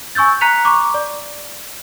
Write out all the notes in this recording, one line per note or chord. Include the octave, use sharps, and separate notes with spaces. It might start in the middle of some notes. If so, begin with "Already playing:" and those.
G#5 C#6 E6 G6 A6
A#5 F#6 B6 C#7 F7
A#5 C#6 D6
D5